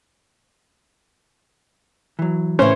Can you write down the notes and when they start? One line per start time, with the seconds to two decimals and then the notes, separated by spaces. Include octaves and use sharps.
2.19 E3 F#3
2.59 A2 C#3 E3 C#4 C5